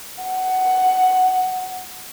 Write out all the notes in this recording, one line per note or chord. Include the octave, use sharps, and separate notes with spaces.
F#5